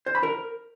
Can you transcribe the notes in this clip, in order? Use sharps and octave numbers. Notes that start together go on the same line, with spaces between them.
C5
B5
A#4